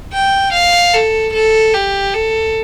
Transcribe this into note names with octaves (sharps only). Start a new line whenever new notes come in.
G5
F5
A4
A4
G4
A4